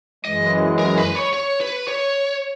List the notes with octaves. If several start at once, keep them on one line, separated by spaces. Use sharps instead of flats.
F#2 E3 G#3 D#5
A#4
B4
C#5
C#5
B4
C#5